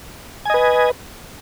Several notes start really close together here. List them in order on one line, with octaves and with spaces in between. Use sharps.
G#5 D#5 B4